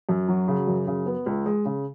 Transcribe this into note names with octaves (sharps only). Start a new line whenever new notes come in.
F#2
F#3
C#3
F#2
C#3
B3
C#2
G#3
C#3